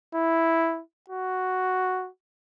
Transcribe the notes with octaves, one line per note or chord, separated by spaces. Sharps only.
E4
F#4